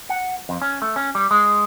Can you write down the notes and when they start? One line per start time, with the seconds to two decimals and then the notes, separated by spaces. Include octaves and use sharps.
0.09 F#5
0.49 F2
0.62 C#4
0.82 A3
0.96 C#4
1.15 G3
1.31 G#3